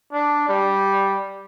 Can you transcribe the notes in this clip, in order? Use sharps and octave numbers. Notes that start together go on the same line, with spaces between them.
D4
G3